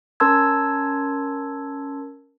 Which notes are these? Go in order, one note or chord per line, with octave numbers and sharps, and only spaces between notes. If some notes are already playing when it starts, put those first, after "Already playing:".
C#4 A#4 A5 C6 E6 G#6